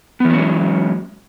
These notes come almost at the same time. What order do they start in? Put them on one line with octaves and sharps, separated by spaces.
B3 E3 F#3 C#4 G#3